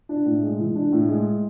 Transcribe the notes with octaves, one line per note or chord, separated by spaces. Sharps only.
D4
A2
G#3
E3
D4
A2
G#3